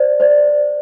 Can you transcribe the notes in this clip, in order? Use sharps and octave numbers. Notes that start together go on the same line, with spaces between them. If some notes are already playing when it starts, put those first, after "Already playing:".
Already playing: C5 D5
C5 D5